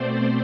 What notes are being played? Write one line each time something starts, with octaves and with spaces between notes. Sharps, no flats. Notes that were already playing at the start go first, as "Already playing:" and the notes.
Already playing: B2 A3 C4 C5 D5